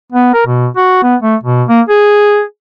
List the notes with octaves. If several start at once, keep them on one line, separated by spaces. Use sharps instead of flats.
B3
A#4
B2
F#4
B3
A3
B2
A#3
G#4